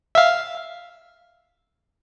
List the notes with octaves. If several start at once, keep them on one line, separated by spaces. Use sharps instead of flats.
E5 F5